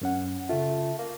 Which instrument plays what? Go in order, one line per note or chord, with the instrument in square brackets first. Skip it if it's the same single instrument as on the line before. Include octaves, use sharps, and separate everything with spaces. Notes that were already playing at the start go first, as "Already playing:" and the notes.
[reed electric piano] F#2 C#4 F#5
[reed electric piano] C#3 F4 [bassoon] A3
[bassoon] A#3